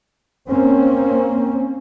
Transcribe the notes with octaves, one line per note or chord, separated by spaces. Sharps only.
A#3 C4 C#4